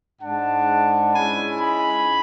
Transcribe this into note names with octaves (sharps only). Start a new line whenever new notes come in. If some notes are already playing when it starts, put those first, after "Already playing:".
G#2 G#3 D4 F#5 A5
G#2 G#3 C#4 E4 G#5 B5
G#5 B5